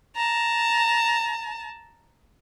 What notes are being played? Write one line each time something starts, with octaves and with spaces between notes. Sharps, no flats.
A5 A#5